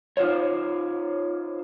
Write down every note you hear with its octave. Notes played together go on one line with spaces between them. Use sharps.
D#4 F4 G#4 C5 C#5